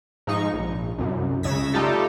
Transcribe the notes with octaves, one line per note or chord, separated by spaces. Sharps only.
G#2 F3 D#4 C#6
A#1
C2 F#2
C#2 C#3 E6 G#6 A#6 B6
G3 A3 D#4 F4 G4 A4